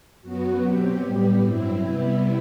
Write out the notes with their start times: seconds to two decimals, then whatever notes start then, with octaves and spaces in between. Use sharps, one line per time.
0.22 F#2 F#3 B3 F#4
0.60 B2 F#3 C4 G4
1.00 A2 G3 B3
1.39 G2 F#3 C4 E4
1.78 C3 G3 B3 E4